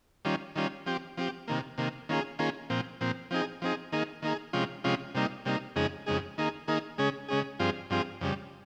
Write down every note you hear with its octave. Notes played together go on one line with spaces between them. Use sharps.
D#3 G3 C#4 F4
D#3 G3 C#4 F4
F3 C4 G4
F3 C4 G4
C3 D#3 A#3
C3 D#3 A#3
D#3 A#3 C#4 F4 G#4
D#3 A#3 C#4 F4 G#4
A#2 F3 C4
A#2 F3 C4
F3 C4 D#4 G#4
F3 C4 D#4 G#4
D#3 A#3 D#4 G#4
D#3 A#3 D#4 G#4
C3 F3 G#3 C#4 F4
C3 F3 G#3 C#4 F4
C3 G3 A#3 D#4
C3 G3 A#3 D#4
F2 C#3 G#3 D#4 G#4
F2 C#3 G#3 D#4 G#4
D#3 A#3 D#4 G#4
D#3 A#3 D#4 G#4
C#3 G#3 C#4 G#4
C#3 G#3 C#4 G#4
G2 F3 C4 F4 G#4
G2 F3 C4 F4 G#4
F2 C#3 G3